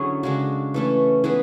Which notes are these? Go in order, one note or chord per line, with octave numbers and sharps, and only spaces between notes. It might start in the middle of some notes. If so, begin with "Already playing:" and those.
Already playing: D3 F#3 C#4 E4 G#4
C#3 G#3 D4 F#4
E3 A3 C#4
E3 G#3 B3 G#4 B4